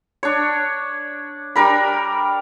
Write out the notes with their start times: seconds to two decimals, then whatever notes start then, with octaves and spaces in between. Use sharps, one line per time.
0.23 D4 C#5
1.56 G3 D4 A#4 B5